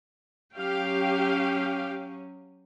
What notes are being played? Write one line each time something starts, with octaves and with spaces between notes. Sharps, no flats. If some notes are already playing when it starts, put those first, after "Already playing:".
F#3 C#4 G4 F5 G5